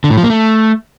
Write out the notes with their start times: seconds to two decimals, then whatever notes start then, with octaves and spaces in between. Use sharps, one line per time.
0.04 D3
0.10 A2
0.17 F3
0.23 A#3
0.30 A3